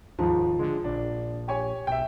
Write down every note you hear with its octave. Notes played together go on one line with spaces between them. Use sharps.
D#2 G#2 F3
D3 G#3
A#1 D4
G4 C#5 G#5
B1 E5 G5